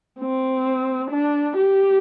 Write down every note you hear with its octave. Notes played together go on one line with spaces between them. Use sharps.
C4
D4
G4